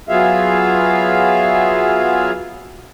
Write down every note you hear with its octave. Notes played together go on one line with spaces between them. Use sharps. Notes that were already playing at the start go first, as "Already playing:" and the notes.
F#3 B3 F4 G#4 E5 F5